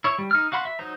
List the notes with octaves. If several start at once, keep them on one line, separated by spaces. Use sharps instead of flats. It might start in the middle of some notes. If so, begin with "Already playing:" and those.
E4 C#5
G3
D#4 F6
F#4 F5 F#5 B5 C6
E5
F#3 D#4 C5 A#5